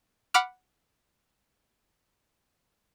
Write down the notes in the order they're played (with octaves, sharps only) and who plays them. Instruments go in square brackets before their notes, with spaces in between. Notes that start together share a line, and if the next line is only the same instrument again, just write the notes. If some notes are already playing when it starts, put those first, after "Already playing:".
[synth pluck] F#5 B5 D6 F6